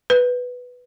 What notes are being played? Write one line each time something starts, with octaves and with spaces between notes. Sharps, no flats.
B4